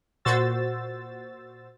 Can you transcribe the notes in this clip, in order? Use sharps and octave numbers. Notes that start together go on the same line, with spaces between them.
A#2 F#4 C5 E6 A6